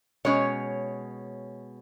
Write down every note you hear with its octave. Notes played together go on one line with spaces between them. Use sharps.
B2 G#3 C#4 C#5